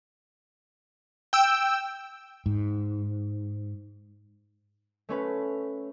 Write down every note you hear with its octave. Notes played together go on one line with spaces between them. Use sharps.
G5 E6
G#2
A3 C#4 B4